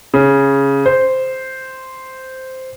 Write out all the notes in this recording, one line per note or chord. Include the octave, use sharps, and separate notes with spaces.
C#3
C5